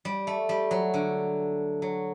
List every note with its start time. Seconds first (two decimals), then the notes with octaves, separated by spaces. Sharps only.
0.05 G3
0.27 A3
0.49 G3
0.71 F#3
0.94 D3
1.82 F#3